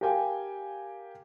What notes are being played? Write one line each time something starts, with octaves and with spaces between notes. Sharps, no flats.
G4 A#4 F5 G5 G#5